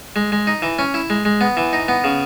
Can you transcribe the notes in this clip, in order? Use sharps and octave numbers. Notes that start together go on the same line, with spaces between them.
G#3
G#3
D#4
E3
C#4
E4
G#3
G#3
B3
E3
D#4
B3
C#3